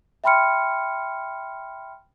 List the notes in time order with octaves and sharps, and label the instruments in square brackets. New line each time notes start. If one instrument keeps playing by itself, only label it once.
[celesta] E5 G5 B5 C6 F6 C#7